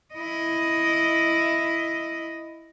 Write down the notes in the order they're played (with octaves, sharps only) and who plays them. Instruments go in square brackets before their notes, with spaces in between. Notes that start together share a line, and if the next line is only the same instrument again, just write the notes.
[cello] E4 D#5